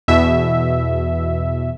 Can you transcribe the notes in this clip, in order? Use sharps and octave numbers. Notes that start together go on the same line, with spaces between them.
E2 B2 E5